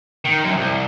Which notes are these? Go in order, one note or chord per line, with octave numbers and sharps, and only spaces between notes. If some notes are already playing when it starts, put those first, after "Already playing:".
D#3
F#2
C2